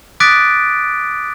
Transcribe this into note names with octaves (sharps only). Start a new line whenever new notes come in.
D6 D#6 F#6 A6 B6 D7